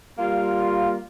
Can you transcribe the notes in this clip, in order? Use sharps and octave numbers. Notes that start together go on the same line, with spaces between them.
G3 A#3 F4